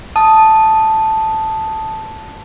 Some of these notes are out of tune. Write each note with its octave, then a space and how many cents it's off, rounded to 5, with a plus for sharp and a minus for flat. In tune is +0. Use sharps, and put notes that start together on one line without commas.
A5 +0 D#6 +0